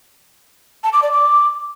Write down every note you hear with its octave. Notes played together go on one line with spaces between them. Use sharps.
A5
D6
D5
D6